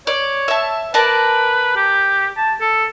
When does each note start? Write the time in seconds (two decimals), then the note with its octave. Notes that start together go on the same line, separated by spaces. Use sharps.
0.07 C#5 D5
0.48 E5 A5
0.94 A#4 B4 D5 A5
1.76 G4
2.37 A5
2.61 A4